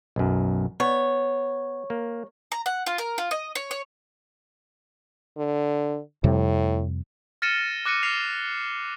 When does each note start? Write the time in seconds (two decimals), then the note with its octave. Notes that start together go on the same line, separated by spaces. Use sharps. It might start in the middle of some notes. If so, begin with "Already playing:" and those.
0.16 B1 F#2
0.80 B3 C#5
1.90 A#3
2.52 A#5
2.66 F#5
2.86 F4
2.98 A#4
3.18 F4
3.31 D#5
3.55 C#5
3.71 C#5
5.38 D3
6.24 F2 A2 C3 G3
7.42 F6 A6 A#6 C#7 D#7 E7
7.85 D6 F#6 A#6 C#7 D#7
8.03 F6 C7 F7